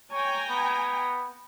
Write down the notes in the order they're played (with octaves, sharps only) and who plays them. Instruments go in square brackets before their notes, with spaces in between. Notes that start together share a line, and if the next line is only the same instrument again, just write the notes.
[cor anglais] C#5 [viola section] G5 G#5 A#5
[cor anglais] B3